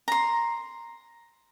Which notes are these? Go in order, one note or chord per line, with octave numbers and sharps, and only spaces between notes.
A#5 C6